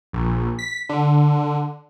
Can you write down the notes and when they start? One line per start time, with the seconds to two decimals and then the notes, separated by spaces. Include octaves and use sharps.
0.13 A#1
0.59 B6
0.89 D3